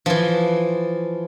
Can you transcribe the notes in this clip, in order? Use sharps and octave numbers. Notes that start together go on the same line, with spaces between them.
E3 F3